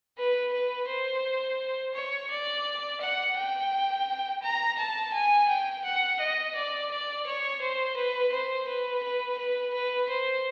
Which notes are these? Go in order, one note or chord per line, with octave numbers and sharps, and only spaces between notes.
B4
B4
C5
C#5
D5
F#5
G5
A#5
A5
G#5
G5
F#5
D#5
D5
D5
C#5
C5
B4
C5
B4
B4
B4
B4
C5